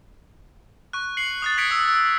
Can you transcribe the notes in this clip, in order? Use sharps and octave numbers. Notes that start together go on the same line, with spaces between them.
C#6 F#6
C7 C#7 F#7
D#6 F#6 A6
D#6 G#6 B6 C#7 D7
D#6 E6
E6